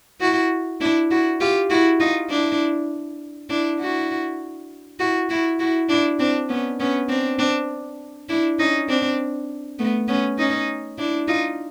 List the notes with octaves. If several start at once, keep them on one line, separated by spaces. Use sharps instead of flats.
E4 F#4
D4 E4
E4 F#4
F4 G4
E4 F#4
D#4 F4
D4 E4
D4 E4
E4 F#4
E4 F#4
E4 F#4
E4 F#4
D4 E4
C4 D4
B3 C#4
B3 C#4
C4 D4
C4 D4
D4 E4
C#4 D#4
C4 D4
A3 B3
B3 C#4
C#4 D#4
D4 E4
D#4 F4